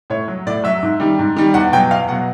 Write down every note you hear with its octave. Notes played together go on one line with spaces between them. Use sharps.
A2 C#5
F#3
A2 D5
F#3 E5
G#2
D#3 G3
G#2
D#3 G3
E2 F#5
B2 F#3 G5
E2 F5
B2 F#3 F#5